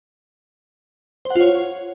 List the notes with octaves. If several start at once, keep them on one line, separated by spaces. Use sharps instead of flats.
C5
F#5
F4
C#5